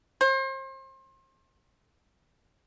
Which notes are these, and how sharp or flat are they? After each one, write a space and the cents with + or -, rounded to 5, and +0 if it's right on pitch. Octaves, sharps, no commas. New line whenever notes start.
C5 +35